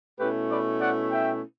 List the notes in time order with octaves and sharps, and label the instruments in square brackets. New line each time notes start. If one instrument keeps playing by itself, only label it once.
[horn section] B2 A3 C#4 E4 G4 B4
B4 D5
D5 F#5
E5 G5